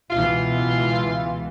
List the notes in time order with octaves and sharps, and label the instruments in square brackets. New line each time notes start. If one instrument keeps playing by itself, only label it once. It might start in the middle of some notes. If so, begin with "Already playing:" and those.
[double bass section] C#2 B2 E3 [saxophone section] F4